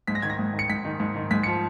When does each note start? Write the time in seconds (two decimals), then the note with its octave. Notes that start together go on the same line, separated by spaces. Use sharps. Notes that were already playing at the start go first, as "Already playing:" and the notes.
0.07 G#2 B6
0.15 A#6
0.22 D#3 G#6
0.30 A#6
0.39 G#2
0.53 D#3
0.59 C#7
0.69 G#2 B6
0.85 D#3
1.00 G#2
1.16 D#3
1.31 G#2 B6
1.43 F3 C#7